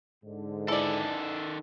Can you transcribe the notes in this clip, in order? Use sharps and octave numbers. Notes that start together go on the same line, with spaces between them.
G#2 D3
D#3 E3 A4 D5